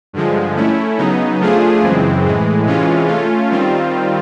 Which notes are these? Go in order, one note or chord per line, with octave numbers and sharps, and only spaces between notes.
G2 D3 F3 G#3
A3 C#4 E4
C#3 F#3 B3 D#4
F3 A3 D4 F4 G#4
F#2 C#3 E3 G#3 C4
A2 E3 G#3
C3 E3 G#3 C#4 F4
A3 C#4 F4
D#3 G3 C4 F4